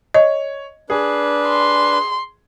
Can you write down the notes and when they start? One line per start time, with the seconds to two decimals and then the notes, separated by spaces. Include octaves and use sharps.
0.14 C#5 D#5
0.90 D4 G#4 B4
1.49 C6